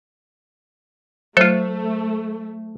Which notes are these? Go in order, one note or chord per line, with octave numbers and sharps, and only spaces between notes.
F#3 A3 F4 A4 C5